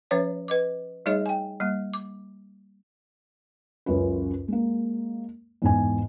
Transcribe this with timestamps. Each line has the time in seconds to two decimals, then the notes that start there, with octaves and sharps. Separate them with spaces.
0.11 F3 C#4 B4 C#5 E5
0.48 B4 D#5 D6
1.06 G3 A3 D#4 G#4 C#5 D#5
1.26 G5 G#5
1.60 G3 A#3
1.94 D6
3.86 C#2 F#2 C#4 F4 B4
4.48 G#3 A#3
5.62 E2 G#2 G#5